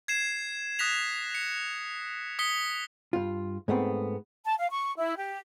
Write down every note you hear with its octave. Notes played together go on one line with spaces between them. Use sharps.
G#6 C7 E7
D#6 F#6 A#6 B6 F7
C#7
D#6 B6 C#7 G7
G2 F4
G#2 A3 B3 C4
A5
F5
C#6
E4
G4